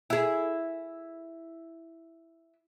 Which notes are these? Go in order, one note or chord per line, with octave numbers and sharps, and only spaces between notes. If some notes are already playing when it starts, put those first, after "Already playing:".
E4 G#4